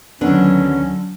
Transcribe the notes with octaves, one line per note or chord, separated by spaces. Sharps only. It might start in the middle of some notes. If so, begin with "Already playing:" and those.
D2 D3 D#3 F#3 B3 C#4 D4